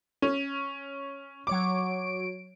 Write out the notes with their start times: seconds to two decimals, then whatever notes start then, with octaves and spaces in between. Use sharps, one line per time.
0.22 C#4
1.47 F#3 C#5 D6 D7